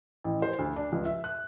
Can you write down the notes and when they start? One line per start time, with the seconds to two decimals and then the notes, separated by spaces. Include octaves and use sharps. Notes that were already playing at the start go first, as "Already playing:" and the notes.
0.24 A1
0.42 C5
0.59 D2
0.76 D4
0.92 C#2
1.05 E5
1.24 F#6